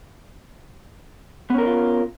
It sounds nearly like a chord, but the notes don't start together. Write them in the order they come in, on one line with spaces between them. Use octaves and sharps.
B3 C#4 A#4 D4 F4